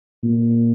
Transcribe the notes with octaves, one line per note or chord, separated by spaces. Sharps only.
A#2